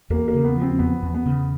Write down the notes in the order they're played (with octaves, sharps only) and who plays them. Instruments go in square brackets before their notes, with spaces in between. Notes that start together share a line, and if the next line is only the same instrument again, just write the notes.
[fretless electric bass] E2 [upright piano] A#3
[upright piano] A#3
[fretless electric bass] C#3
[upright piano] B3
[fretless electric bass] F3
[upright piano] C4
[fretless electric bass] E2 [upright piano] B3
[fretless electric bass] E2
[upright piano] B3
[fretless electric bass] C#3